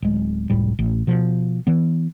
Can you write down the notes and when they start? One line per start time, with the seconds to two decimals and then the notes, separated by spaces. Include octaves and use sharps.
0.02 D1 G#3
0.50 F1 C#2 A2 G3
0.79 A1
1.07 B2 F3
1.67 E3 B3